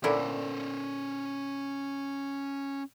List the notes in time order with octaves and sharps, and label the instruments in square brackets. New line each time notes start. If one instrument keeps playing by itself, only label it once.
[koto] A#2 D3 E4 [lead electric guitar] C#4 C5